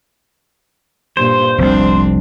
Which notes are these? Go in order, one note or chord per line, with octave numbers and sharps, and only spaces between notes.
G2 A#2 C5
F1 C2 C4 D4